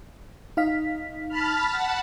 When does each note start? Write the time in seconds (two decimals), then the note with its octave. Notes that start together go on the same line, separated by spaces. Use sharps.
0.57 D#4 F5 B6
1.29 A5 B5 F6
1.70 F#5 A5 B5